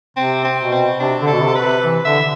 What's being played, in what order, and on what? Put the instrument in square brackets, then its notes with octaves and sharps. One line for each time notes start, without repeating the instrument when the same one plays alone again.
[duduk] C3 [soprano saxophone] C4
[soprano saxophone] C4
[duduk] B2
[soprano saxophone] C4
[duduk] C3 [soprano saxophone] D4
[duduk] D3
[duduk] B2 [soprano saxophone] A4
[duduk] C3
[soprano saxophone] B4
[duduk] C3
E3
[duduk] D3 [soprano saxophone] E5